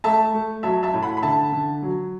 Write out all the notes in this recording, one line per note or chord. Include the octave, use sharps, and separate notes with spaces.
A3 E5 A5
A3
F#3 E5 A5
E5 A5
A2
F#5 B5
B5
D3 E5 A5
D3
F#3